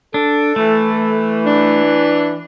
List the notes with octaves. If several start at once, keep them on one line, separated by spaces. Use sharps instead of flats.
D4 A4
E3 A3
D4